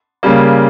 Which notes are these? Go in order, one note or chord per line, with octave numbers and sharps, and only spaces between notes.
C#3 G3 A#3